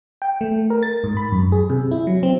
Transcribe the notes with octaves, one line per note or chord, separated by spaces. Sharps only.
G5
A3
A#4
A6
G#2
B5
F#2
G#4
C3
E4
F#3
C4